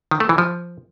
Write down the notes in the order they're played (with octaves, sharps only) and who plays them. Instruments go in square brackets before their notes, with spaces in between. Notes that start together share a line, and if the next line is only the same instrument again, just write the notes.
[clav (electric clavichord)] D#3
A3
E3
F3